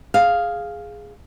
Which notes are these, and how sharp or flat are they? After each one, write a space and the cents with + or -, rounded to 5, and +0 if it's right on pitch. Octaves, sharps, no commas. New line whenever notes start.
G#4 +0 F5 +0